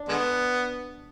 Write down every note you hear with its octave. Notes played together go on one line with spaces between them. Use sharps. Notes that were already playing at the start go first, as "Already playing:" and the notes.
Already playing: D4
D3 G#3 B3